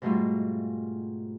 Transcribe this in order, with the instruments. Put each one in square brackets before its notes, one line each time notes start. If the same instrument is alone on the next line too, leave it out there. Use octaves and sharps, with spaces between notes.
[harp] G#2 B2 G3 A3 D#4 F4